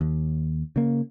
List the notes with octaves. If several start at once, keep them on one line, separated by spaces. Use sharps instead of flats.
D#2
C#3 A#3